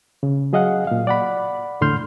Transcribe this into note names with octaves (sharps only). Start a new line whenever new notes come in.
C#3
F#3 G#4 D#5 F5 F#5
A#2 F5
D5 F#5 B5
E2 A2 D3 C6 F6 G6